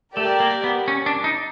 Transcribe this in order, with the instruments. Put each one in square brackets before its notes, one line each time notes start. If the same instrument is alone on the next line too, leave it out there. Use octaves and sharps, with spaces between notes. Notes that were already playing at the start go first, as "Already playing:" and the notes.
[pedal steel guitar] A3 [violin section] G4 A#4 D5
[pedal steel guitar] A#3
B3
C#4
D4
D#4